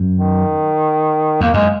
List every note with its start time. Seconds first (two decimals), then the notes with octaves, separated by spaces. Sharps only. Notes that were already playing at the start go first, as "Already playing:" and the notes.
Already playing: F#2
0.15 D#3
1.41 E2 A#3
1.54 F#2 G#3